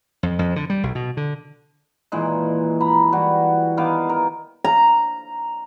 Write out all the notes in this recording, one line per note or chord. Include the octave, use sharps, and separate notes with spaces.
F2
F2
D3
G3
B1
B2
D3
A#2 D#3 E3 G#3
A#5 B5
E3 G3 F#4
D#3 B3 F5 D6
A#4
A#5